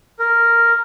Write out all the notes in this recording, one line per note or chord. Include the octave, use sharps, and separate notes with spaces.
A#4